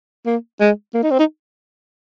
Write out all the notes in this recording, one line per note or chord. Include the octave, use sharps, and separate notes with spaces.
A#3
G#3
A#3
D#4
C4
D#4